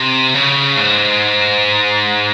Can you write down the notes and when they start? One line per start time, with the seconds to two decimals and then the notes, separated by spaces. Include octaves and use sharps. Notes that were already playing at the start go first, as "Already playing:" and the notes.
Already playing: C3
0.34 C#3
0.77 G#2